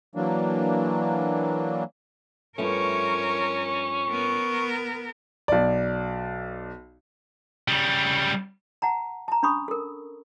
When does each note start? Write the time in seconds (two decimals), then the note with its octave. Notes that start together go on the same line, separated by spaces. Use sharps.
0.15 E3 F#3 A#3 D4
2.58 G2 F3 A3 C#4 A#4 C#5 C#6
4.10 B3 A#4
5.48 B1 D5
7.68 C#3 G3
8.82 F#5 A5 A#5
9.28 A5 A#5
9.43 C#4 D4 B5 C#6 D#6
9.68 A4 A#4